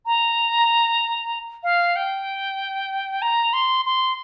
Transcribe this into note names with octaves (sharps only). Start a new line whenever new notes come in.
A#5
F5
G5
A#5
C6
C6